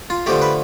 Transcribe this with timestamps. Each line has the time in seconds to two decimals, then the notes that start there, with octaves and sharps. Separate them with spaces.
0.10 F4
0.26 D3 F3 A3 G4
0.42 B4